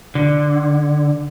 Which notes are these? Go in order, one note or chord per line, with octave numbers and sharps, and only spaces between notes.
D3